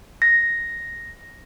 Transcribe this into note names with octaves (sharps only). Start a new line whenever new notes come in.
A#6